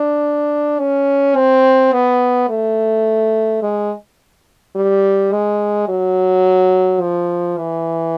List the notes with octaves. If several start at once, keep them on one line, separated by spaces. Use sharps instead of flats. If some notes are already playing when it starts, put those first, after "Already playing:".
Already playing: D4
C#4
C4
B3
A3
G#3
G3
G#3
F#3
F3
E3